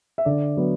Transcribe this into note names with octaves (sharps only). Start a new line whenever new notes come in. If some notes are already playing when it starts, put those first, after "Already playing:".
E5
D3 D5
F#3 B3